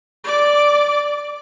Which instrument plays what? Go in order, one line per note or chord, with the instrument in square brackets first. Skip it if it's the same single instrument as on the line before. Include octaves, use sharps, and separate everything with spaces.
[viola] D5 D6